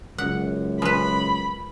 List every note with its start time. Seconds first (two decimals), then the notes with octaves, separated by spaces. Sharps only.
0.18 C#2 F#2 F#5
0.82 F3 B4 B5